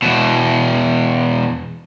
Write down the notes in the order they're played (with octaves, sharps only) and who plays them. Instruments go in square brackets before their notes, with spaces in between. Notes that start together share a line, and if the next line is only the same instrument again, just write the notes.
[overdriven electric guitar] E2 B2